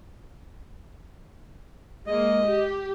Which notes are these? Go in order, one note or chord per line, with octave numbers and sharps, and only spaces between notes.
G#3 A#3 D#5
G4